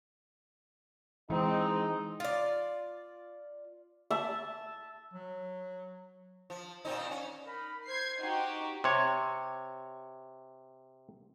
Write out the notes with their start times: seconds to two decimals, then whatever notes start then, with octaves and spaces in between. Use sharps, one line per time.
1.30 E3 G#3 C4 D#4 D#5
2.20 F4 D5
4.10 E5 A5
5.14 F#3
6.50 F3
6.85 A#2 C4 D#4
7.11 C#4
7.46 D#4 A#4 B5
7.87 C5 G#6 C7
8.19 D#4 F#4 G4
8.84 C3 C#5